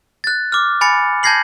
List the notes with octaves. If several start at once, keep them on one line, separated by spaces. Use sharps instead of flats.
F#6 A6
D6 F6
G#5 B5 A6 C#7
A5 G6 G#6 A#6 C7 F#7